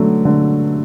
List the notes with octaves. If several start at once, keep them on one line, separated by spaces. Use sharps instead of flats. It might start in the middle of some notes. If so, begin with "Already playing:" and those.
Already playing: D3 F#3 A3
D3